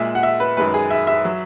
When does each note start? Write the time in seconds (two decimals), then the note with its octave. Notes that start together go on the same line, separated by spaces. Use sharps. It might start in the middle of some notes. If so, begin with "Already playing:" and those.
Already playing: A#2 G#3 E5
0.15 F#5
0.23 E5
0.40 B4
0.57 F#2 D#3 G#3 B4
0.74 G#4
0.91 E5
1.07 E5
1.25 F#3